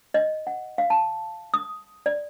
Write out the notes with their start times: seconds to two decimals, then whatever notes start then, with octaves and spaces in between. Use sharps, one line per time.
0.14 D#5
0.47 F#5
0.78 F5
0.90 A5
1.54 D#6
2.06 D5